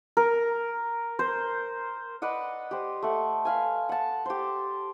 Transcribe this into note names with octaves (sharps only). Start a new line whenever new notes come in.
A#4
C5
B4 D5 D#5 F#5
G4 C5
A3 F#5
B4 F5 G#5
F#5 A5
G4 C5